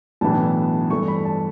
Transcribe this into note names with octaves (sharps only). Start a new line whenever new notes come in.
B1 A2 E3 B3 D4 A5
G2 E3 A3 C#6
B5
A5